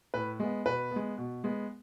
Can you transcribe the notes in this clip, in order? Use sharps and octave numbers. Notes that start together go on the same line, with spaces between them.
A2 B4
G#3 B3
B2 B4
G#3 B3
B2
G#3 B3